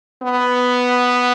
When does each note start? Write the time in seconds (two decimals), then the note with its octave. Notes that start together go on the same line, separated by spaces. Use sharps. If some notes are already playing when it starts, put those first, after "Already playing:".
0.22 B3